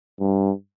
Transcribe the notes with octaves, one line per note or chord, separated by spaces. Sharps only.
G2